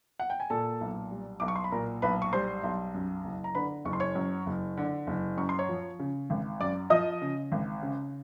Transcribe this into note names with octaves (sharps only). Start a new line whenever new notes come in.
F#5
G5
G#5
A#2 A4 A5
B1
G3
B1 D6
C#6
C6
B5
A#2 A#4 A#5
B1 B4 B5
C#6
G3 C5 C6
B1
F#2
F#1
A#5
D3 B4 B5
F#1 C#6
C6
C#5 C#6
F#2
F#1
D3
F#1
F#2 C#6
C6
C#5 C#6
F3
C#3
G#1
F#2 D5 D6
F3 D#5 D#6
C#3
G#1
C#3